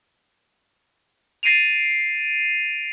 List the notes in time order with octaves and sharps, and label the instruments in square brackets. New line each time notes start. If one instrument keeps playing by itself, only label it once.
[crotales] A6 A#6 C7 D7 D#7 F7